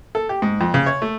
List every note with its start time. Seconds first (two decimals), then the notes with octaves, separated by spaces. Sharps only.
0.15 A4
0.29 G4
0.42 G#2
0.61 F2
0.74 C#3
0.86 C#5
1.02 A3